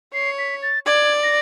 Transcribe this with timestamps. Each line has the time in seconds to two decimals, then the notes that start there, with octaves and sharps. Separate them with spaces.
0.14 C#5 C7
0.39 B6
0.62 A6
0.86 D5 G#6
1.23 A#6